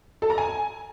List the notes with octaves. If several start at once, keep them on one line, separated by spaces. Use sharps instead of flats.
A4
A#5
G#5